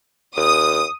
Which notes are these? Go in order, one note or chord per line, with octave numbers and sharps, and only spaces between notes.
D#2 D#6